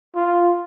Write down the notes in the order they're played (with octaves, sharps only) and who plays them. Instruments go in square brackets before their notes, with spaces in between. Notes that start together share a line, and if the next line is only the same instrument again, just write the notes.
[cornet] F4